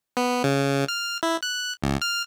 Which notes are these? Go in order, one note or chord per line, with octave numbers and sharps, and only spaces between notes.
B3
C#3
F6
E4
F#6
C#2
F6